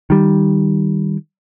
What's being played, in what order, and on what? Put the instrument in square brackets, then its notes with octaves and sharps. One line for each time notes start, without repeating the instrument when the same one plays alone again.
[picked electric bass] D#3 G3